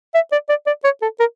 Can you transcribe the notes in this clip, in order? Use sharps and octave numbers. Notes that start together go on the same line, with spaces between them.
E5
D5
D5
D5
C#5
A4
A#4